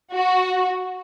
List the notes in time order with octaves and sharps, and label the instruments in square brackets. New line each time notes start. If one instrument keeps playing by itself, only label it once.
[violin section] F#4